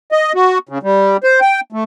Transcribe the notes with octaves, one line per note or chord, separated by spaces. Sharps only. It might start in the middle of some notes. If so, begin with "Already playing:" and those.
D#5
F#4
C#3
G3
C5
G5
A3